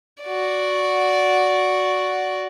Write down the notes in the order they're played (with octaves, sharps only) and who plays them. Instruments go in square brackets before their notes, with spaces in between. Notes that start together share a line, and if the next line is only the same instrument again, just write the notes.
[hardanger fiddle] F#4 D5